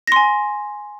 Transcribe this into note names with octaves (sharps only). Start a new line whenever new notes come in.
G#5 C6 A#6